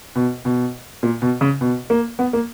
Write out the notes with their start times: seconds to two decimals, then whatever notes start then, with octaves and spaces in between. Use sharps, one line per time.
0.15 B2
0.45 B2
1.03 A#2
1.22 B2
1.41 C#3
1.61 B2
1.90 A#3
2.19 B3
2.33 A#3